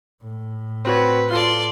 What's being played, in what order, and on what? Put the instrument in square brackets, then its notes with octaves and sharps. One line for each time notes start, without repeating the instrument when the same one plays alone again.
[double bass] A2
[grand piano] C4 F#4 C#5 [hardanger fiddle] B4
[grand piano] F4 A4 [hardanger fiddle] D5 C6